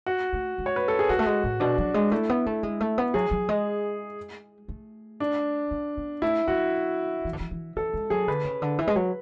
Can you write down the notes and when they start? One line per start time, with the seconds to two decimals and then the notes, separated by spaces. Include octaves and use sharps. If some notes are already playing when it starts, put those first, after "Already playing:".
0.06 F#4
0.33 A3
0.58 G#3
0.66 C#5
0.76 B4
0.88 A4
0.99 G#4
1.09 F#3 F#4
1.19 A3
1.26 G#3
1.44 A2
1.60 B2 D4
1.78 F#3
1.94 G#3
2.11 A3 E4
2.29 B3
2.46 A3
2.63 G#3
2.80 A3
2.98 B3
3.14 F#3 G#4
3.31 F#3
3.49 G#3
4.68 A3
5.20 D4
5.71 B3
5.97 B3
6.22 A3 E4
6.48 F#3 F#4
7.25 E3
7.33 D3
7.40 E3
7.51 E3
7.76 E3 A4
7.93 G#3
8.10 F#3 G#4
8.28 D3 B4
8.45 C#3
8.62 D3
8.79 E3
8.87 G#3
8.96 F#3